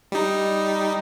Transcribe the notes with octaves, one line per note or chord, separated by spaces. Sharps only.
G3 D#4